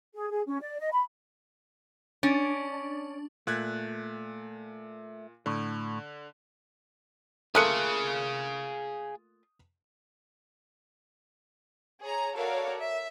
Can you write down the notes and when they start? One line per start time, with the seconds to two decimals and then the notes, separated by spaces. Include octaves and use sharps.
0.14 G#4
0.30 G#4
0.47 C#4
0.61 D5
0.79 D#5
0.92 B5
2.23 C#4 D4
3.47 A#2 A3 F#6 G#6
5.46 A2 D3
7.55 A3 A#3 F4 G#4 F5 D#6 F#6 C#7
12.02 G#4 C#5 A#5
12.36 F#4 A4 A#4 C#5 D5 F5
12.79 E5